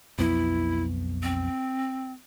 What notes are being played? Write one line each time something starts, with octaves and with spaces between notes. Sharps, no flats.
B1 F2 B3 E4
C4